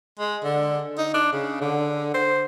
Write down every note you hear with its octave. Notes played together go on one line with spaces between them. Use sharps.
G#3
D3
D#4
D4
C#3
D3
C5